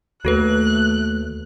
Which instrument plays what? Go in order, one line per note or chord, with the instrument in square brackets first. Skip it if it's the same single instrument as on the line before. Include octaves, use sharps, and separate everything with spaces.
[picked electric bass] D#2 [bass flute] A3 [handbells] F#4 A4 B4 [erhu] F#6